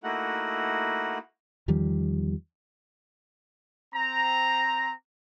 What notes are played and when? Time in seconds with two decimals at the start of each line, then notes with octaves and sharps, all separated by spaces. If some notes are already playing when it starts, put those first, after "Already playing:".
0.03 A3 A#3 D#4 E4 F#4 F#5
1.68 E2 D#3 F3 G3
3.95 C4 A#5